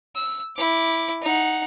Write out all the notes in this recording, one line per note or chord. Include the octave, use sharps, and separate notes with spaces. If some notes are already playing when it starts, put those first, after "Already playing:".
E6
E4 D6
D#4 F#5